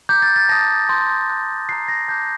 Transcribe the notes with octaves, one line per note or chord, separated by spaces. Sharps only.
A#5 D6 G6
A6
A6
A5 D#6 G6 A#6
A5 C6 G6
A5 C6 F#6
A#5 F#6 C7
A#6
A5 D6 F#6 G6